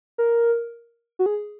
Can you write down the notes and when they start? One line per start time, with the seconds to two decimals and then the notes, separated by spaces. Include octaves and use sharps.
0.18 A#4
1.19 F#4
1.26 G#4